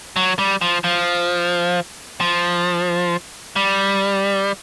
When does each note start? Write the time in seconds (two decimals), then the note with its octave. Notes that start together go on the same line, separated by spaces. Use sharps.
0.16 F#3
0.39 G3
0.62 F3
0.84 F3
2.21 F3
3.56 G3